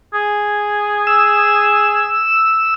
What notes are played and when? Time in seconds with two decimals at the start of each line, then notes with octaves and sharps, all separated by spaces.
0.14 G#4
1.07 E6